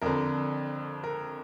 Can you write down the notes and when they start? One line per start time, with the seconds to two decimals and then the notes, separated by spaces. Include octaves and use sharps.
0.02 F2 D3 A#4
1.04 A#4